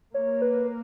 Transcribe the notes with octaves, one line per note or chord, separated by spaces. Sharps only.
A#3 C#5
B4